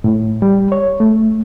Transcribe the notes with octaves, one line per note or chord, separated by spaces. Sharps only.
A2
G3
C#5
A3